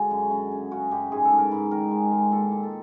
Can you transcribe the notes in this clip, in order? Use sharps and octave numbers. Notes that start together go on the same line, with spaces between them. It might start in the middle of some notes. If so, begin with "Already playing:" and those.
Already playing: D3 G#3 F#4
F#2
F#2
C#3
C#3 F#4
F#2 G4
G#2 G#4
A4
G#2
A#4
G#2 B4
D#3 A#4
G#3
G#3
A#2 A4
A#2
A4